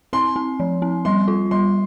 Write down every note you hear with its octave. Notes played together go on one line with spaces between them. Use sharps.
C4 C6
C4
F3
C4
G3 C6
F4
G3 C6